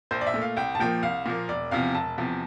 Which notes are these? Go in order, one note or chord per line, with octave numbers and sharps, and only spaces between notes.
A#1 C5
D5
E5
A#2 A3
F5
C2 G5
A5
A#2 F3 A#3 G5
C2 F5
A#2 F3 A#3
E1 D5
E2 C3 F3 F5
E1 A5
E2 C3 F3